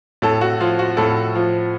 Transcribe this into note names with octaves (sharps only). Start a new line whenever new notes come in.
A2 A4
F#4
F3 F4
F#4
A2 A4
F3